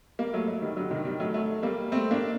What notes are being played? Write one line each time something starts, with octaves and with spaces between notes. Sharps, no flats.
G3 A#3
F#3 A3
F#3 A3
D#3 G3
D3 F#3
C3 D#3
D#3 G3
F#3 A3
F#3 A3
G3 A#3
A3 C4
A#3 D4